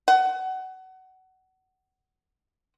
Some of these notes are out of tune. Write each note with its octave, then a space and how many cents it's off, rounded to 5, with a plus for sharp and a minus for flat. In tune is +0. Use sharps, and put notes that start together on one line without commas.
F#5 +25